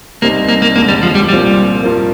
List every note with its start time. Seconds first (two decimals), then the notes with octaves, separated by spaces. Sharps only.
0.22 C2 C3 G3 A#3 C4 D#4
0.48 A#3
0.62 A#3
0.75 F1 D#2 D3 G#3 A#3
0.88 G3
1.03 F3
1.15 G3
1.29 C2 A#2 F3 G3 C4
1.83 G2 F3 A#3